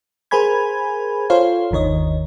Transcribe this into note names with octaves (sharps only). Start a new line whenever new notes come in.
G#4 A#4 C5 G#5 B5 G#6
F4 A4 C5 C#5 F5
G1 D#2 D#3 C#5 D#5